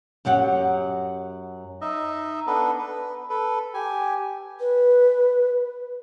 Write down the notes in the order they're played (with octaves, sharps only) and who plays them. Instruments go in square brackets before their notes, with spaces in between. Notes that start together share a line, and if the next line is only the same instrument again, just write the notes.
[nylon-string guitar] F#2 F#3 G4 F#5
[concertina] D#4 D#5 E5
B3 D4 A4 B4
B4
A4 B4
G4 G#5
[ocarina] B4